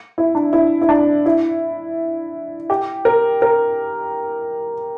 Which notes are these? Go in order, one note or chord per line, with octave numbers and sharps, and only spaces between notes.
E4
D4
E4
E4
D4
E4
G4
A#4
A#4